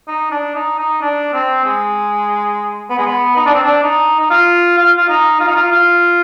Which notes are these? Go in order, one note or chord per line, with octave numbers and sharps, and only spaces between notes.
D#4
D4
D#4
D#4
D4
C4
G#3
B3
G#3
B3
D#4
D4
C4
D4
D#4
D#4
F4
F4
F4
D#4
F4
D#4
F4
F4